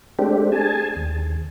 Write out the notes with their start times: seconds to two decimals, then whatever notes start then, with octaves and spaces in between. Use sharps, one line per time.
0.19 G#3 A3 C4 D4 G4
0.52 G#4 G#5 A5
0.96 D#2